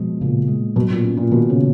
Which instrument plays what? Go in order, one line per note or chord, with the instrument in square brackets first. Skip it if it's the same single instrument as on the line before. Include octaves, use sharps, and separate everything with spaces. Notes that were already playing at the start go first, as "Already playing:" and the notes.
Already playing: [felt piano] B2 [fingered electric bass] F3 G#3
[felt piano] A#2 [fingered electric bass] C#3
[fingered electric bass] G#3
[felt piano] B2 [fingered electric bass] F#3
[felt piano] A#2
[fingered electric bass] C#4
[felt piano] A#2
[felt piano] B2 [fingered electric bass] D#3
[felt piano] C#3